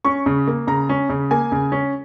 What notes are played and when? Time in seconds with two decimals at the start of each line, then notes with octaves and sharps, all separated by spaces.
0.05 C#4 C#6
0.26 C#3
0.48 A#3
0.67 C#3 A#5
0.89 C#4
1.09 C#3
1.31 A#3 G#5
1.52 C#3
1.72 C#4